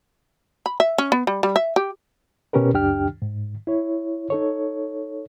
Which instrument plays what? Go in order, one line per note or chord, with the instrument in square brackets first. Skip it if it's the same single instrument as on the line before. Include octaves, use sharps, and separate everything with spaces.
[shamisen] B5
E5
C#4
B3
G3
G3
E5
G4
[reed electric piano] B2 C#4 G4 A#4 B4
C#2 F#2 D4 G4 G5 F6
G#2
E4 C#5
D#4 A4 C#5